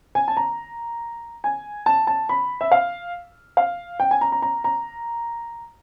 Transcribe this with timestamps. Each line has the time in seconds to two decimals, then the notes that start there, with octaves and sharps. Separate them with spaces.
0.15 G#5
0.28 A5
0.37 A#5
1.44 G#5
1.86 A5
2.07 A5
2.29 B5
2.61 E5
2.72 F5
3.57 F5
4.00 G5
4.11 G#5
4.21 A#5
4.32 A#5
4.42 A#5
4.64 A#5